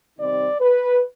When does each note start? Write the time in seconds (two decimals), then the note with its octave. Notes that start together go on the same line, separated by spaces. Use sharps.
0.19 C3 D#3 G3 C4 D#4 D5
0.61 B4